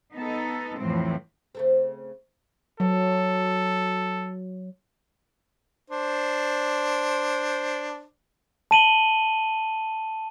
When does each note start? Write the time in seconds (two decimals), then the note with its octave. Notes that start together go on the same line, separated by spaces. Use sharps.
0.14 B3 D#4 A4
0.79 F2 A2 E3 C4
1.55 C#3 A3 C4
2.80 F#3 A4
5.90 D4 C5
8.71 A5 D#7 F#7 G7